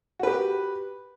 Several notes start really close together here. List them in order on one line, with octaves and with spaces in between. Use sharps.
F#4 B4 G4